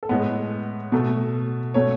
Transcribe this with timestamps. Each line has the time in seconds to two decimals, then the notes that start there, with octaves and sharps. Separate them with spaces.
0.03 A4
0.09 A2 G#3 B3 B4
0.92 B2 A3
1.74 B2 A3 C#4 C#5